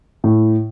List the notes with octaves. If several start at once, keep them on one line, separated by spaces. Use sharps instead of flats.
A2